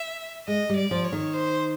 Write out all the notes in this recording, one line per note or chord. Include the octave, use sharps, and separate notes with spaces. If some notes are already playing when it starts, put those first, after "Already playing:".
Already playing: E5
G#3 D#5
G3
D5
F3
C#5
D#3
C5